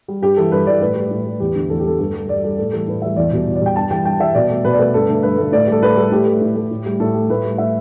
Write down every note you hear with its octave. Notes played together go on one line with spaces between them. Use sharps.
G3
G2 G4
E3 G3 A4
G2 B4
E3 G3 D5
A2 B4
G3
A2
G3
E2 G4
D3 A3
E2 A4
G4
D3 A3 A4
G2 A4
G3
G2 D5
G3 A4
A2 A4
E3 G3 A4
A2 B4
E3 G3 E5
E2 D5
B2 G3
E2
D5
B2 G3 G5
G2 A5
E3 G3 G5
G2 G5
E3 G3 E5
B2 D5
A3
B2 B4
D5
A3 B4
G2 A4
D3 A3
G2 B4
D3 A3
A2 D5
G3 A4
A2 B4
G3 A4
A2 G4
A3
A2
A3
A2
G3
A2 A4
G3
A2 B4
G3
A2 E5